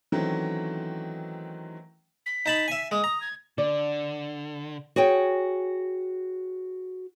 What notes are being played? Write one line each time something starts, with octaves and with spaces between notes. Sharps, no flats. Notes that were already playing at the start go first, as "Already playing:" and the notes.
D#3 E3 F#3 A3 C4 C#4
B6
D#4 A5 B5
E5 G#5
G#3 D#6
A#5
G#6
D3 D5
F#4 G#4 C#5 G5